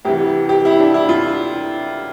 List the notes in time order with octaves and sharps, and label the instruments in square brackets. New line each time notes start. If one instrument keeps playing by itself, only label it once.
[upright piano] D2 C3 E3 G4
G4
E4
D4
E4
F4